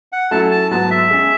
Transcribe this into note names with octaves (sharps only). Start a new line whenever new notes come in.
F#5
F#3 A3 C#4 E4 A4 A5
A5
G#2 F#3 B3 A5
E5
G#3 C#4 G#4